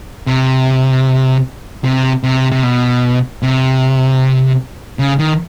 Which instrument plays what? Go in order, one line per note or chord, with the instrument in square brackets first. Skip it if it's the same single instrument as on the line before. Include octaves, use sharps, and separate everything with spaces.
[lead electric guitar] C3
C3
C3
C3
B2
C3
C#3
D#3